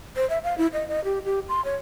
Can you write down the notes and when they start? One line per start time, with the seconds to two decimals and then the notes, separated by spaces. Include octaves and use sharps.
0.16 C5
0.30 E5
0.44 F5
0.58 E4
0.73 D#5
0.89 D#5
1.04 G4
1.25 G4
1.49 C6
1.65 C#5